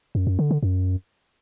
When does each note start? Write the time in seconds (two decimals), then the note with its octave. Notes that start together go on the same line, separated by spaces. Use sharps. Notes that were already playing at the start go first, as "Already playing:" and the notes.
0.15 F#2
0.27 F#2
0.39 D3
0.51 D3
0.63 F#2